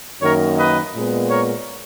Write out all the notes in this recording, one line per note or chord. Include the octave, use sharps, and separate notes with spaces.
F#2 D#3 A#3 A#4 C#5
B4 D#5
A#2 G#3 B3
A#4 C#5